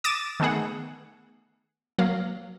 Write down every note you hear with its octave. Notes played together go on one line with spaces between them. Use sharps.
D6 D#6 A6 E7
D#3 A3 B3 G#4 F#5
F#3 A#3 F5